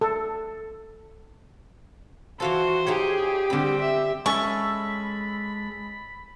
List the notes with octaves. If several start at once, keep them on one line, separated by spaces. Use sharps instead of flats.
A4
E3 F4 F#4 A4 C5
D#4 F4 G4 G#4 C#5
D3 G3 C4 B5
G4 E5
G#3 C#4 A4 E5 B5 C#6